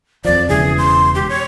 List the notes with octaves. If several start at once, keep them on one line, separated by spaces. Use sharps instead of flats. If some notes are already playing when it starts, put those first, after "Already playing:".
F2 F3 D5
E1 C#3 E3 G#4
C6
G4
C#5